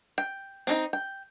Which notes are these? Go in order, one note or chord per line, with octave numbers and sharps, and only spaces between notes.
G5
C4 C#4 D#4
G5